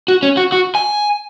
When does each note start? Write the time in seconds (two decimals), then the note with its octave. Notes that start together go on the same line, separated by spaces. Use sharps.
0.08 F#4
0.23 C#4
0.37 F#4
0.52 F#4
0.75 G#5